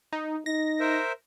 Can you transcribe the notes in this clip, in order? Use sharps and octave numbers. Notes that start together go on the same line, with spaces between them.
D#4
D#4 A#6
A#4 C5 E5